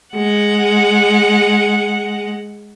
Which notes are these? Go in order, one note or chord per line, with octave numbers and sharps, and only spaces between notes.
G#3 F#5